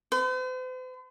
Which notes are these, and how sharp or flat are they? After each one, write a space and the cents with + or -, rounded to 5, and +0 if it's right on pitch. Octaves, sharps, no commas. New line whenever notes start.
C5 -45